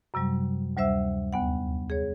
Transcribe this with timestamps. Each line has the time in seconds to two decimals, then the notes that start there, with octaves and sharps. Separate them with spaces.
0.14 F#2 C3 F#3 G3
0.77 D2 G3 C5 E5 E6
1.33 D#2 B3 F#5
1.90 G#4 C#5